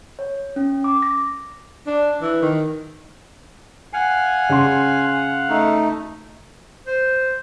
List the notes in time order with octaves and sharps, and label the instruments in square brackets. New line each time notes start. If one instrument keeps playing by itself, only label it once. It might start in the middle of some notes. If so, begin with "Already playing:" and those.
[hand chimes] C#5
C#4
D6
A#6
[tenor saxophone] D4
E3
D#3
[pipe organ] F5 F#5 [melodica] G#5
[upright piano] C#3 C6
[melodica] A3 D#4
[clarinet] C5